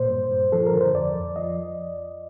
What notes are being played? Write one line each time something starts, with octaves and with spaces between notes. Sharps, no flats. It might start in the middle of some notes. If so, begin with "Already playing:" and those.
Already playing: A#2 C5
G2
G2
F3 A4
A#4
D3
C5
F2 D5
F2
F3 D#5